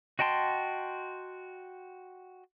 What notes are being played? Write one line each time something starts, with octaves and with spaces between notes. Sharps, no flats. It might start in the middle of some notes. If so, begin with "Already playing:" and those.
F#4 D#5 G5 A5 C6